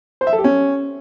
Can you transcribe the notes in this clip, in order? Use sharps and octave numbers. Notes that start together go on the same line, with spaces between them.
C5
E5
A4
G4
C#4